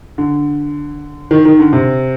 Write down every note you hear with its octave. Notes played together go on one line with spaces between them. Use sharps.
D3
D#3
D#3
D3
C3